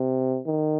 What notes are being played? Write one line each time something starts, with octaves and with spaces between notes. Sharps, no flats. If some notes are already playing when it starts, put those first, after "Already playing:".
Already playing: C3
D#3